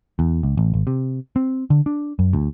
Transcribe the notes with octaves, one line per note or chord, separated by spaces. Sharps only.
E2
C#2
A1
G#1
C3
C4
D3
D4
F#2
D2